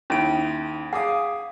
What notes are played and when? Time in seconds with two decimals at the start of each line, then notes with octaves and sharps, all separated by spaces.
0.10 D#2 D#3 C#4 E4 D7
0.93 G#4 F5 F#5 D6 D#6